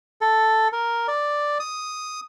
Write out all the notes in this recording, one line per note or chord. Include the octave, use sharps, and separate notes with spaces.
A4
A#4
D5
D#6